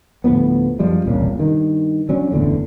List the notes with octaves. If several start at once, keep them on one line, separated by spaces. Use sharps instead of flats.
D2 A2 F3 B3
F#2 F3 G3 G#3
E1 C2 A#2 C#3
G2 D#3
F#3 C#4 D4
F#1 E2 A2 D3